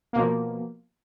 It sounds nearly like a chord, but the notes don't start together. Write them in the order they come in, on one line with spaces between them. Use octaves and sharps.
A#3 B2 F3